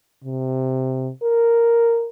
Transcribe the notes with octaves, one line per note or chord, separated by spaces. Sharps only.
C3
A#4